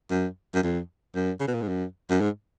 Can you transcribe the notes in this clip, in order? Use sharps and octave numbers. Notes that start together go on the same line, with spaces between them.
F#2
F#2
F2
F#2
C#3
B2
A#2
G#2
F#2
F#2
G#2